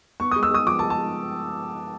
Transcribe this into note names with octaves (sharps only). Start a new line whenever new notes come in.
B3 C#6
D#6
G#3
E6
G#3 D#6
F3 D6
A5
G#3
A5
G#3